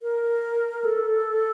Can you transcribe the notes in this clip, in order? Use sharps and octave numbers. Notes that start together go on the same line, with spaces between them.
A#4
A4